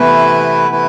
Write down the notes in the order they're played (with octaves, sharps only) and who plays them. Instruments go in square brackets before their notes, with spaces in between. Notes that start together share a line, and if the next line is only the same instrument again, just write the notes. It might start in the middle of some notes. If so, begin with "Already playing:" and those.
Already playing: [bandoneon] C3 E3 A3 E4 B4 [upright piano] B3
[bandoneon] C3 E3 A3 E4 B4